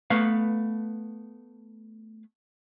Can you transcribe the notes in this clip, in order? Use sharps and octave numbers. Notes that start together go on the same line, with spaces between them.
A3 B3 B4 F5